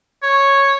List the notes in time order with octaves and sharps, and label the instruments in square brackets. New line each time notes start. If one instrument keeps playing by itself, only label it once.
[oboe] C#5